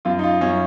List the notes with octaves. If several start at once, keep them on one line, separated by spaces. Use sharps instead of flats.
F#2 F4
D#4
F4
F#2 C#4